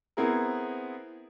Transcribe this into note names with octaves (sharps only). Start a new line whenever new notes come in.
B3 C4 E4 G#4 A#4